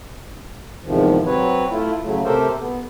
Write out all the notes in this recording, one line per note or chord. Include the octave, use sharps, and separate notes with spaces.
E2 G#2 C3 D#3 F3
F#3 C4 B4 C#5
A3 E4 F4
C#3 F#3 A3
C3 A3 G4 A4 A#4 C5
B3